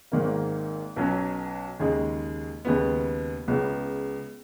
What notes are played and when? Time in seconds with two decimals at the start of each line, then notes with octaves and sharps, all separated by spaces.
0.12 G#1 G#2 D#3 A#3
0.96 B1 B2 F#3 C#4
1.80 D#2 C#3 G#3 D#4 G#4
2.65 D#2 C#3 G#3 B3
3.48 C#2 C#3 G#3 B3